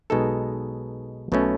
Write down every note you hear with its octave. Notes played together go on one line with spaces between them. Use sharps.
B1 B2 G#3 D#4 A4
B1 B2 A3 C#4